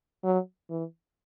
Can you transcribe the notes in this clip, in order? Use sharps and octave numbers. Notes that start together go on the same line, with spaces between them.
F#3
E3